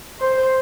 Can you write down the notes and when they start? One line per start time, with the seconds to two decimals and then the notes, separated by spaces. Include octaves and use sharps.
0.20 C5